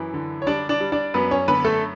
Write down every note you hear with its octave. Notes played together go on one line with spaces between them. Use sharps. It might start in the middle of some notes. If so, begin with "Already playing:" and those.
Already playing: F#2 E3 E4
D3
C#5
G3 D4 D5
D4 D5
G3
D4 D5
F#2 B3 B4
C#4 C#5
D3 B3 B4
A3 A4